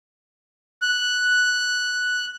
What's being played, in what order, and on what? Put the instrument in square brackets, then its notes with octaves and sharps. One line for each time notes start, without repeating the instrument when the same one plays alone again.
[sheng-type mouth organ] F#6